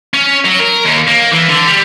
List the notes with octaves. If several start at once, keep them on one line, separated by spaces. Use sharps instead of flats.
C#4
F#3
A#4
D#2
A#3
E3
D3
G3